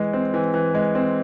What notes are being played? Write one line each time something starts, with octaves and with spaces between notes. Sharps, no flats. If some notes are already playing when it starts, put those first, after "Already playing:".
Already playing: E3 G#3
C4
E3
E3
G#3
C4